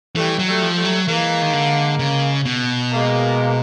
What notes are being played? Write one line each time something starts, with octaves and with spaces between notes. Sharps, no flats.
E3 G3 A3
F#3
G3 A3
F3
G3 A3
F#3
E3 G#3 A#3
D#3
D3
C#3
B2
G#3 A#3